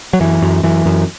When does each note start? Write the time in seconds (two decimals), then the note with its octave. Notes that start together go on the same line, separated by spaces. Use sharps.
0.13 F#3
0.21 F#2 E3
0.42 F#2
0.63 F#2 E3
0.85 F#2